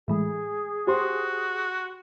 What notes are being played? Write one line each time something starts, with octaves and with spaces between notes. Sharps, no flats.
A2 E3 G#3 G#4
F#4 G4 C5 C6